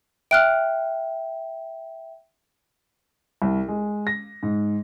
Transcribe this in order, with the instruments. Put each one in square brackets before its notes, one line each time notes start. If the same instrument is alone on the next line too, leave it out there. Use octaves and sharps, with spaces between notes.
[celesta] E5 G5 [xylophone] F6 F#6 D7
[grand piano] C2
G#3
A#6
G#2